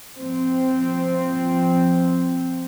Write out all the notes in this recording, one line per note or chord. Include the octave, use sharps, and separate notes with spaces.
F3 C4